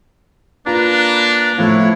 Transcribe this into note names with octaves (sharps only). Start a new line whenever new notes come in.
A#3 D4 F4 B4 A#5
A2 F3 A3 E4 F4 C#5